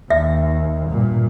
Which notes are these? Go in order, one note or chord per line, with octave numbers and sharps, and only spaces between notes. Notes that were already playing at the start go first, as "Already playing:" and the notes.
D#2 E5
G2 A#2